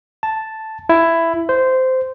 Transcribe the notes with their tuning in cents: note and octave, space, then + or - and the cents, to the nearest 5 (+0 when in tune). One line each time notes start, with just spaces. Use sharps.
A5 +0
E4 +10
C5 -15